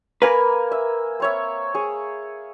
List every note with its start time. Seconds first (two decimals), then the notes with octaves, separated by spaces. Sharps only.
0.22 A#3 A#4 B4 G#5 B5
0.72 E5
1.20 C4 C#5 E5
1.75 G#4 C#5